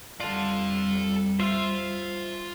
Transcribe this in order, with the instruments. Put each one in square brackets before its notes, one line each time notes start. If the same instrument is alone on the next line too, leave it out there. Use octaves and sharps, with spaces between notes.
[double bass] F2 G3 [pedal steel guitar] F4 [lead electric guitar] A4 D5
[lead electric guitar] F4 C6 [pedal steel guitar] C5 E5